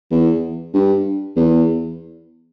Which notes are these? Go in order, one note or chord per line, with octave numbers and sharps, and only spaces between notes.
E2
G2
E2